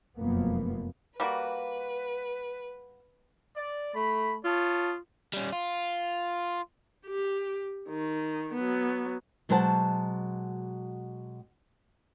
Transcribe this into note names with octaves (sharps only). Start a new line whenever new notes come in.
F1 F#2 F3 A#3 B3
G3 A#3 F#4 B4
D5
A3 B5
F4 C#5 A5 D#6
G3 C#4
F4
G4
D#3
F#3 B3
B2 F#3 G#3 C5 F#5 A5